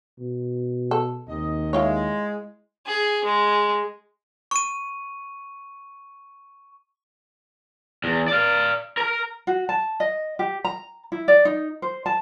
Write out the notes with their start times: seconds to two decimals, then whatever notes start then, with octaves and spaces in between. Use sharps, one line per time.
0.19 B2
0.91 A4
1.28 D#2 C3 D#5
1.73 G#3 E4 F4 C#5
2.86 G#4
3.25 G#3
4.51 C#6 D#7
8.04 E2
8.28 D5 F5
8.97 A#4 A#5
9.47 F#4
9.69 A5
10.00 D#5
10.39 G4
10.64 A#5
11.12 E4
11.28 D5
11.45 D#4
11.82 C5
12.06 A5